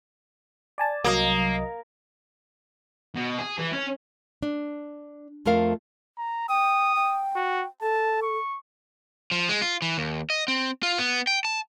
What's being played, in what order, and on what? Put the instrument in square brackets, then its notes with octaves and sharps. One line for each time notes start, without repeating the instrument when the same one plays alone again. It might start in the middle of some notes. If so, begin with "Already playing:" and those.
[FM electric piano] D5 G#5 A5
[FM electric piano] C2 F#3 D#5 [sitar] A#3
[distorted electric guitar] B2
G#4
E3
C#4
[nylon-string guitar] D4
F2 A3 F4 A#4 F5
[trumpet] A#5
[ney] G5 [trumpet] D#6
[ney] G5
[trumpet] F#4
[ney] A4 [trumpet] A5
[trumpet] C#6
[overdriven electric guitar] F3
G#3
F4
E3
D#2
D#5
C4
F4
B3
G5
A5